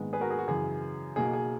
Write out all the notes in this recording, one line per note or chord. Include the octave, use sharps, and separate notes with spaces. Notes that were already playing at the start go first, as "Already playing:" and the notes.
Already playing: A#1 G#2 D#3 G#3 B3
G#4 B4
F#4 A#4
G#4
F#4
F#2 C#3 E3 G#4
B1 B2 A#3 G#4
G#4